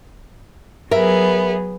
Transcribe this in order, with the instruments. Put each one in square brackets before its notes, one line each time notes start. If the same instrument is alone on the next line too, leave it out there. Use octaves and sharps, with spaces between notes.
[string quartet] F#3 B3 G#4 [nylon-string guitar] A#4 E5